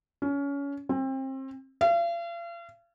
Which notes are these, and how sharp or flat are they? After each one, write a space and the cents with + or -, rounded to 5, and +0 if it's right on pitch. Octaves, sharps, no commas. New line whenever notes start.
C#4 +25
C4 +30
F5 -40